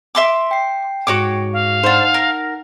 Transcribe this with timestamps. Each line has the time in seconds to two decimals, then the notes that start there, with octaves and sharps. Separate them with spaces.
0.15 E5 C6 D6
0.51 G5 C7
1.07 G#2 F#4 C#5 D6
1.53 F5
1.83 D4 D#4 C5 F#5
2.14 A#4